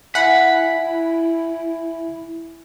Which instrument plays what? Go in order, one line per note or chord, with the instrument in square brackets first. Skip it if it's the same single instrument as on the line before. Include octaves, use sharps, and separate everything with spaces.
[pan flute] E4 [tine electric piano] E5 G#5 [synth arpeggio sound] F#5 [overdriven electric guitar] B5